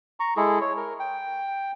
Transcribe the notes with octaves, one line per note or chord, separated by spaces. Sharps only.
A#5 C#6
G#3 E4 G#4 A4
C#5
A#4
G5